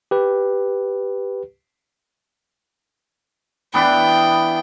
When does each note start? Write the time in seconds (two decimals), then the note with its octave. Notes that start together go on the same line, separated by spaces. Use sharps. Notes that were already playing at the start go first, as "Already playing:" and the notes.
0.11 G4 B4
3.74 E3 B3 D4 G5